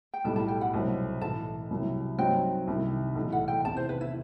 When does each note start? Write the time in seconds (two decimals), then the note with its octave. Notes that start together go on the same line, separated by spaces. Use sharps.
0.14 G5
0.24 B1 A2 G3 A5
0.36 A5
0.48 G5
0.61 F#5
0.73 C2 B2 F#3 C4
1.21 B1 A2 E3 B3 A5
1.71 C2 C3 F#3
2.18 G2 F#3 C4 D#4 G5
2.67 C2 C3 D#3
3.15 B1 A2 E3 A3
3.32 F#5
3.48 G5
3.65 E2 C3 D#3 A5
3.77 C5
3.89 B4
4.01 E4